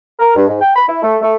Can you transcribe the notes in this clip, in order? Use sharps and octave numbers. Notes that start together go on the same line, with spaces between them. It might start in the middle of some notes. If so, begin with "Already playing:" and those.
A#4
G2
G#2
G5
B5
E4
A3
A3